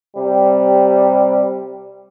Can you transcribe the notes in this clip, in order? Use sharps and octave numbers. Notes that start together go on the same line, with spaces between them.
C3 G3